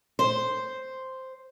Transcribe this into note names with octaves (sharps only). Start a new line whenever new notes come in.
C5